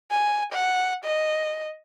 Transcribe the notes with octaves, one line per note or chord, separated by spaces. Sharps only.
G#5
F#5
D#5